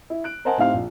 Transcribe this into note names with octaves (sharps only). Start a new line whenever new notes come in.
E4
F#6 D7
A#4 C5 D#5 F#5 G#5 A5
A2 C4 D#4 E4 G4 F5
A#1